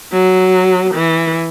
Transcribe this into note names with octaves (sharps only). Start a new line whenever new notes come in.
F#3
E3